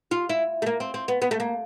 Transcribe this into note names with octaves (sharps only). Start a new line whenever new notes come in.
F4
E4
A3
A#3
C4
C4
B3
B3
A3
A#3